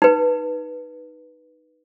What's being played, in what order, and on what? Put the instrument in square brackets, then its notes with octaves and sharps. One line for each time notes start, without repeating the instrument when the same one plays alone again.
[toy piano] D#4 B4